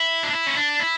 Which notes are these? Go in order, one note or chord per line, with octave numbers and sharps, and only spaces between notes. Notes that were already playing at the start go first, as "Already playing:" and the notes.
Already playing: E4
D4
E4
C#4
D4
E4